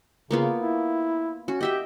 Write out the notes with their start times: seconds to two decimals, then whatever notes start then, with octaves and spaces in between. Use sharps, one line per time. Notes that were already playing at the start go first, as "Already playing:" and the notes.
0.31 C#3 A#3 B3 F4
0.59 E4
1.48 C#4 F#4
1.61 G4 D#5 E5 G5